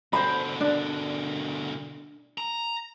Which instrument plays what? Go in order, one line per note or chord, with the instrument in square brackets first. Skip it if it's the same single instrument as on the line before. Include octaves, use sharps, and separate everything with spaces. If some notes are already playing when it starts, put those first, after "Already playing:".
[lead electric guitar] B2 D3 [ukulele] C5 B5
[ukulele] D4
[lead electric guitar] A#5